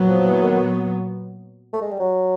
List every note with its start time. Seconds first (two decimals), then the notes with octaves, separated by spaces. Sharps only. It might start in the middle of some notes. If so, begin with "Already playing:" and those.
Already playing: A#2 F#3 B3
0.08 F3
0.26 E3
0.43 D#3
1.73 A3
1.81 G#3
1.91 G3
1.99 F#3